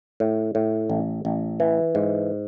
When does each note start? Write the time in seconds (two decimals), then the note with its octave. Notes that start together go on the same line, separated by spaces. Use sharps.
0.20 A2
0.55 A2
0.90 A1
1.25 A1
1.60 E3
1.95 G#2